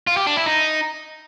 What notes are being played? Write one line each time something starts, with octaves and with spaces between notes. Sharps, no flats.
F4
G4
D4
E4
D#4